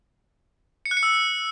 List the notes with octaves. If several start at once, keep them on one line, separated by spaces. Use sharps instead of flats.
C#7
F#6
C#7
E6